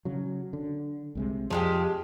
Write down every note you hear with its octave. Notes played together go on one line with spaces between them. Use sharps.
C#3 F#3
D3
C2 C3 G#3
F2 F3 G#3 G4